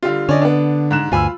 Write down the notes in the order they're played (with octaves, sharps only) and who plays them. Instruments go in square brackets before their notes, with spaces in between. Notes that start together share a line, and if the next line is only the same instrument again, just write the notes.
[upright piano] D3 G3 F4
[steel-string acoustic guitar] D3 [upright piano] C#4 D5 D#5
[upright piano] B3 D4
G#2 F#6 E7
[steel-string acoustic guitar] D2 G2 G#5 [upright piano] F4 B5 E6